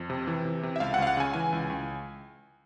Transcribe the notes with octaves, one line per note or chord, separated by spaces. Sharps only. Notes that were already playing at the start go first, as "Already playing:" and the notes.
Already playing: F2
C3
E3
C3
C3
E5
C#2 F5
F#5
C#2 F5
F#5
C#3 G#5
E3 G#5
C#2
C#2